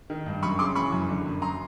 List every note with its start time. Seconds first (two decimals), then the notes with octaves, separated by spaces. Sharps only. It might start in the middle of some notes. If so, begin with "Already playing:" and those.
0.10 D#3
0.26 G2
0.43 F#2 B5 C#6
0.59 C#3 C6 D6
0.75 E3 B5 C#6
0.92 F#2
1.09 D3
1.26 F#2
1.42 A#5 C6